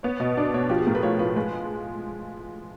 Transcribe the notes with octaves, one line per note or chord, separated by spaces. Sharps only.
B3 C#5
B2 D#5
D4 D5
B2 C#5
F3 G4
G#4
A2 A#4
B4
F3 C#5
F3 B4
G#3 B4